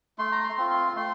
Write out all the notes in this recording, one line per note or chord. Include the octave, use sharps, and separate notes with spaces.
A3 C6
A#5
C6
C4 F4
C6
A3 C6